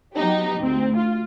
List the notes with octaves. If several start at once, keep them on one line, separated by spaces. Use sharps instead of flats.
F#3 B3 D#4 G4
D2 C4
F4